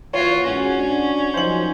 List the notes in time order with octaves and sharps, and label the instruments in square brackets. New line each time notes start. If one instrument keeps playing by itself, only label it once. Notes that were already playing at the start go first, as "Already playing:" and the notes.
[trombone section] E3 A#3 [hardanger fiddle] F4 F#4 [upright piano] C#5
[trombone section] G#2 F#4 [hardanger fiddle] C#4
[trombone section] D4 F#4
[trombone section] F#2 F3 D#4 [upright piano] C5 F#7